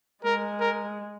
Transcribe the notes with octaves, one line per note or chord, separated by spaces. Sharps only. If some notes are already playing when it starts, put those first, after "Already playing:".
G#3 A#4
A#4